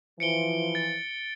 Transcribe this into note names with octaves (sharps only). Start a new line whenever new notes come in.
E3 F3 C#7 D7 G7
A6